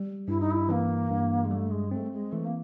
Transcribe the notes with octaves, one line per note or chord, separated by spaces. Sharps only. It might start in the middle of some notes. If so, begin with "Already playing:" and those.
Already playing: G3
G2 E4
D#4
E4
E3 A#3
G2
G#3
G3 A3
G#3
A3 C4
G#3
E3 A3
A#3